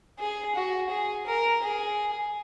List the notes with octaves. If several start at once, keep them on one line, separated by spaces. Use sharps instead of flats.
G#4
F#4
G#4
A#4
G#4